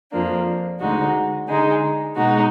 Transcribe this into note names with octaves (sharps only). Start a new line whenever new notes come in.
F2 F3 A#3 D4
D2 D3 G#3 D#4 F#4
D3 G#3 D#4
B2 G#3 D#4 F#4